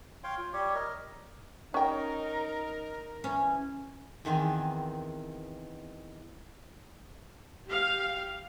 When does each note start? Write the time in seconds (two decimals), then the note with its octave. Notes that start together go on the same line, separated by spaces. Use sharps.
0.24 C#5 F5 G5 C6
0.38 F4
0.53 G3 G4 C#5
0.75 A#4 D#5
1.74 C#4 D#4 A#4 G5
3.24 E3 C#4
4.25 E2 D#3 B3 C4 G#5
7.67 G4 F5